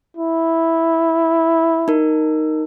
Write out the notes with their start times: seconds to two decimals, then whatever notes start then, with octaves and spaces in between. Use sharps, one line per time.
0.17 E4
1.88 D#4 A#4